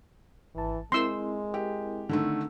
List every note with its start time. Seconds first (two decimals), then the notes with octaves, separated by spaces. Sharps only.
0.55 G#1 E3 A5
0.92 G#3 C4 E4 A#4 C6 E6
1.54 G4
2.09 D3 D#3 A3